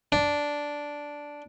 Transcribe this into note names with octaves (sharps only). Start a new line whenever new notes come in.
D4